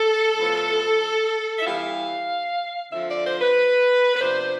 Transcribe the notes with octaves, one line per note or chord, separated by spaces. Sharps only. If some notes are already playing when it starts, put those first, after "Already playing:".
Already playing: A4
A2 F3 B3 E4
E5
E3 G3 B3 E4 F5
D3 F3 C4 E5
D5
C5
B4
B4
C3 F3 B3 D4 C5